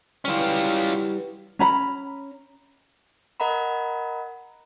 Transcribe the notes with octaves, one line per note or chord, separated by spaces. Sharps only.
E3 F#3 G3 C#4 F4
C#4 A#5 B5
A#4 D#5 F#5 A#5 B5